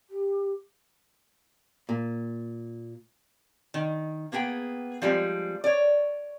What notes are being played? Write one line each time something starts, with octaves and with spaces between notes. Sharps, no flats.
G4
A#2
D#3
A#3 B3 G#4 G5
F3 G3 G#3 C4
C#5 D5